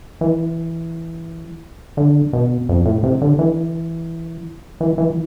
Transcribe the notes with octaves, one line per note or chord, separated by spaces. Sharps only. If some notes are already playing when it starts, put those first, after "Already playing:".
E3
D3
B2
F2
A2
C3
D3
E3
E3
E3